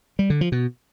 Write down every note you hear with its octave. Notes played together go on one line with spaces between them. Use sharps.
G3
D3
F3
B2